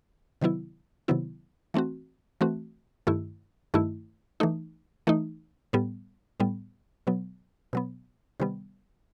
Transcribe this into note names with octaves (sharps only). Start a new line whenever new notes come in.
C3 D#3 F#3 B3 E4
C3 D#3 F#3 B3 E4
E3 A3 C4 F#4
E3 A3 C4 F#4
G2 D#3 A3 E4
G2 D#3 A3 E4
E3 A3 D#4
E3 A3 D#4
A2 G3 B3
A2 G3 B3
B2 F#3 B3
B2 F#3 B3
C3 D#3 G3 B3